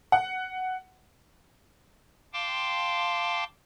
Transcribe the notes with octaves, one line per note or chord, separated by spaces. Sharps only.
F#5
F5 G5 A5 C6 D6